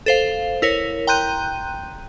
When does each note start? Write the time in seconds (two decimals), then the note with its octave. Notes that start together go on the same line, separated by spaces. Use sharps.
0.06 A4 C5 F5
0.62 E4 A#4 C#5
1.07 G5 A#5 C6 F#6 G6 D#7